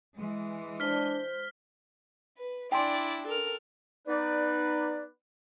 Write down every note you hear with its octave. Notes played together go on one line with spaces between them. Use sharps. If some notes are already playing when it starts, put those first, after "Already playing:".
E3 G#3
D4 C5 F6 B6 G7
B4
D4 E4 D5 G5 G#5 C6
A4 A#4 F6
B3 D#4 B4 D5